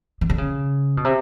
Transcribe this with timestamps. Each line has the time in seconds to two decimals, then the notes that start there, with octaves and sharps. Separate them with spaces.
0.21 D#3
0.30 D3
0.38 C#3
0.97 B2
1.05 C3